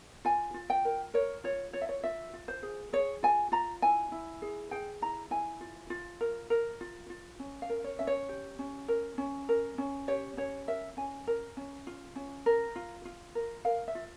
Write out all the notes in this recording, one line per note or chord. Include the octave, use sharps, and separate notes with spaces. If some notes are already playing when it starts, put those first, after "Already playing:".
F4 G#5
F4
G5
A#4
A#4 C#5
F4 C#5
F4 C#5
E5
C#5
F4 E5
F4
C5
G#4
G#4 C#5
F4 G#5
F4 A#5
E4 G#5
E4
G#4
G#4 G5
E4 A#5
E4 G#5
F4
F4
A#4
A#4
F4
F4
C#4
F5
A#4
C#5
C#4 E5
C#5
G4
C#4
A#4
C#4
A#4
C#4
G4 C#5
C#4 C#5
A#4 E5
C#4 G#5
A#4
C#4
F4
C#4
A#4
F4
F4
A#4
A#4 F5
E5
F4